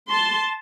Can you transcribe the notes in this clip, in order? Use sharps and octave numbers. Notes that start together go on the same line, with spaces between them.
A5 C6